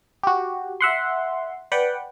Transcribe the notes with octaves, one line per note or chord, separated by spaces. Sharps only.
F#4 G4
E5 F#5 C6
B4 D5 F#5 G5